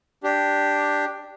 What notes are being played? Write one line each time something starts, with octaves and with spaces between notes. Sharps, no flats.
D4 G4